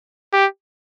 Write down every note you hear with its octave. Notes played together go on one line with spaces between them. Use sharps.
G4